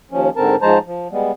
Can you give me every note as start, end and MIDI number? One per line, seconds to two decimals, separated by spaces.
0.11 0.30 39
0.11 0.30 53
0.11 0.30 61
0.36 0.56 44
0.36 0.56 50
0.36 0.56 60
0.36 0.56 70
0.36 0.56 81
0.62 0.79 44
0.62 0.79 53
0.62 0.79 56
0.62 0.79 72
0.62 0.79 81
0.62 0.79 82
0.86 1.08 53
1.11 1.32 55
1.11 1.32 56
1.11 1.32 59